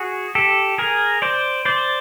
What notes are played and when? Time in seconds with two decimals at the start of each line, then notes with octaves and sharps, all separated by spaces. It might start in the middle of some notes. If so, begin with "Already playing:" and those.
Already playing: F#4 G#4
0.35 G4 A4
0.78 G#4 A#4
1.22 C5 D5
1.65 C5 D5